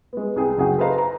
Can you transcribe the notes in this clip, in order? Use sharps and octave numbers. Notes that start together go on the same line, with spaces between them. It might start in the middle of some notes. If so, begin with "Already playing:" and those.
G#3 B3
C2 G#4 G5
F#1 F#4 G#4 F#5 G5
A4 B4 C5 D#5 F5 A#5
A#5